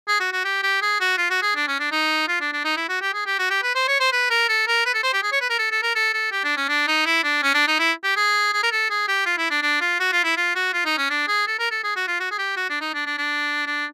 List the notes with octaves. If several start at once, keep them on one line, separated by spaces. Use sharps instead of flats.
G#4
F#4
F#4
G4
G4
G#4
F#4
F4
F#4
G#4
D4
C#4
D4
D#4
F4
D4
D4
D#4
E4
F#4
G4
G#4
G4
F#4
G4
B4
C5
C#5
C5
B4
A#4
A4
A#4
B4
A4
C5
G4
G#4
C#5
B4
A#4
A4
A4
A#4
A4
A4
G4
D4
C#4
D4
D#4
E4
D4
C#4
D4
D#4
E4
G4
G#4
G#4
A#4
A4
G#4
G4
F4
E4
D4
D4
F4
F#4
F4
E4
F4
F#4
F4
D#4
C#4
D4
G#4
A4
A#4
A4
G#4
F#4
F4
F#4
G#4
G4
F#4
D4
D#4
D4
D4
D4
D4